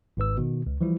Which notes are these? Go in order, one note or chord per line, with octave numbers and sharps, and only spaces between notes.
G#1 G#2 B4 E6
B2 D#3
C#2
E3 F3 G3 E4